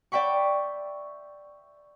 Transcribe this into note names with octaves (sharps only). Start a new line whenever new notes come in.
D5 E5 G5 B5 C#6